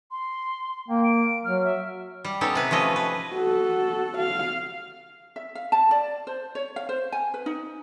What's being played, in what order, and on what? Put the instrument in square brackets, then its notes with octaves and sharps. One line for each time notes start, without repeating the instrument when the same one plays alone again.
[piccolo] C6
[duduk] A#3 [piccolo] G5
[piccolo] D7
[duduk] F#3 [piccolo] F6
[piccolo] E5
[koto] G3
B3 C#4 D#4 G4 A4
C3 B4
F3 A3 C#4 D#5
B4
[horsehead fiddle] F#4 A4
F5
[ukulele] E5
F5
A5
D5
C5
C#5
F5
C5
G#5
B4
D#4